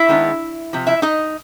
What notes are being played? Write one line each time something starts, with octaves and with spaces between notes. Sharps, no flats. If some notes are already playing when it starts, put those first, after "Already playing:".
Already playing: E4 E5
D#3 G#3 B3 D4
C3 F3
E4 E5
D#4 D#5